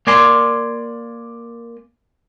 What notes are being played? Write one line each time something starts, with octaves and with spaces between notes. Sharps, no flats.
A#3 D5 G#5 C6